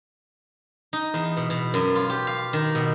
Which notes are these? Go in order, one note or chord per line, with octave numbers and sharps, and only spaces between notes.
D#4
E2
B2
B2
F#2
F4
G4
F5
D#3
B2